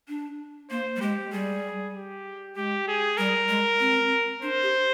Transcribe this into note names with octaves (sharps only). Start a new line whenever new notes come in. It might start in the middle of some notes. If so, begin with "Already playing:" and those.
D4
A#3 C5
G3
G#3 G4
G3 G#4
G4
G#3 G4
G#4
G3 A#4
G#3
C4
D4 C5
G4